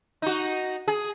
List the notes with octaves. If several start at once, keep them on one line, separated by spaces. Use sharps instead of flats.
D#4 F#4
G#4